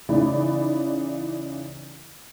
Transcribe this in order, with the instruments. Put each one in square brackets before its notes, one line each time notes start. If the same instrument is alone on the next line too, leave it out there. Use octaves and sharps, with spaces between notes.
[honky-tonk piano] C#3 E3 D#4 D5 B5